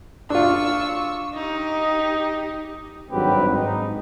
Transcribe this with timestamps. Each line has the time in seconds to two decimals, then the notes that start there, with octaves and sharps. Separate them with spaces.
0.30 D4 F4 C#6 E6
1.34 D#4 G4
3.11 G#1 G2 F#3 C4 G4 B4
3.49 G#2 D#4